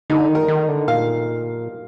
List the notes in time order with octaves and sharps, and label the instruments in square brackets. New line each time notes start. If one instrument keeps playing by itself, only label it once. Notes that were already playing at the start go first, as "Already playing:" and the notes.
[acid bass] D3 [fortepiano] D#4
[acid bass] D#3
[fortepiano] A#4
[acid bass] D#3
D3
[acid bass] A#2 [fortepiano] F5